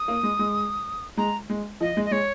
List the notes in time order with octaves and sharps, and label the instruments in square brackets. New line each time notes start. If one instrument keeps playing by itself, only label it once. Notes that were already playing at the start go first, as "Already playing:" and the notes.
Already playing: [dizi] D#6
[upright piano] A#3
G#3
G#3
[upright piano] G#3 [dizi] A#5
[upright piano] G#3
[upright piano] F3 [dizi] D#5
[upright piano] G#3
[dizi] D#5
[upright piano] G#3 [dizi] C#5